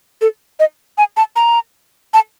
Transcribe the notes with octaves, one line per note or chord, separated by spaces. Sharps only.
A4
D#5
G#5
A5
A#5
A5